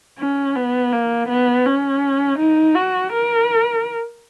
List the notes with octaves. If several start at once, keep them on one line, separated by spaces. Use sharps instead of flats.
C#4
B3
A#3
B3
C#4
D#4
F#4
A#4